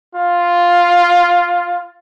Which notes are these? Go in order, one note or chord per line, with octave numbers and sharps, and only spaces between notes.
F4